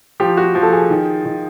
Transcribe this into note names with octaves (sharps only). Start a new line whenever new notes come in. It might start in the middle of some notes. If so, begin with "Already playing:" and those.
F3 G4
F#4
F3
A4
G#4
D#3
D#3